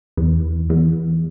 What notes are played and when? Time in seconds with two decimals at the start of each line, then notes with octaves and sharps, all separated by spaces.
0.17 E2
0.70 E2